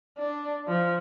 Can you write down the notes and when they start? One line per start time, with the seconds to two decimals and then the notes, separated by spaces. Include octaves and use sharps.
0.18 D4
0.68 F3